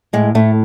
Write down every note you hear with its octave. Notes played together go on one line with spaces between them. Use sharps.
A2 G#3
A2 A3